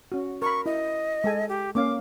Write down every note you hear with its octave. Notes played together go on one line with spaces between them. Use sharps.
C#4 F#4
A#4 B5 C#6
E4 D#5
G#3 A4 G#5
G4
A#3 C#4 F5 D6